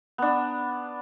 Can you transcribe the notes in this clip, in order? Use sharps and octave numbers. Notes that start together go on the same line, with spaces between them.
B3 D4